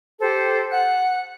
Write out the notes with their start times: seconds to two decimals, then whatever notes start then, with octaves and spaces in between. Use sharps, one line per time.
0.19 G4 A4 C5
0.71 F#5 F#6